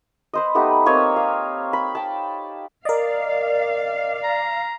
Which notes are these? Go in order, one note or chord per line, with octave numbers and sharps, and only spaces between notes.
B4 C5 D#5
A3 B3 D#4 G4
A#3 C4 C#5 D#5
F5
B5
G5 A5
A#4 D5 D#5 F5
A#5